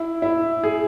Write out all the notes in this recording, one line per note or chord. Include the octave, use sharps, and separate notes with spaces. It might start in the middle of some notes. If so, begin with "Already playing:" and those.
Already playing: E4
E4
G#4